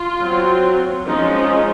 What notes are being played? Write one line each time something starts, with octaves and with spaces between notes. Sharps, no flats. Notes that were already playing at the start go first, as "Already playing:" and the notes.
Already playing: F4
F#3 C4
F3 G#3 C#4 D#4
D#4